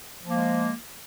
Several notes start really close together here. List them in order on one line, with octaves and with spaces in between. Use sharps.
F3 A#3 G#3